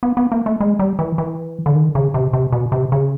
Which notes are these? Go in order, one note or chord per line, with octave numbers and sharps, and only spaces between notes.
B3
B3
A#3
A3
G#3
G3
E3
E3
D3
D#3
C#3
C3
C3
B2
C3
C#3